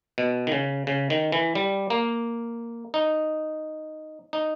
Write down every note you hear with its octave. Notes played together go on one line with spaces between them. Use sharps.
B2
D#3
C#3
C#3
D#3
E3
G3
A#3
D#4
D#4